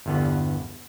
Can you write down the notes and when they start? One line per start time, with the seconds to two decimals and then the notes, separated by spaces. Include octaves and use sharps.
0.06 G1 E2 G2 D3 B3